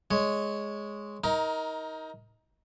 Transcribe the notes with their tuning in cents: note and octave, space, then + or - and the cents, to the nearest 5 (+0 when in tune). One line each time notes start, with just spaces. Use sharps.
G#3 +0 C#5 +0
D#4 +25 A#4 +5